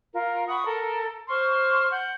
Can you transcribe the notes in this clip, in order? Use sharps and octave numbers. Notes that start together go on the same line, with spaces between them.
F4 A#4
F#5 B5 C#6 D#6
A4 A#4
C5 C6 C#6 F6
F#5 G6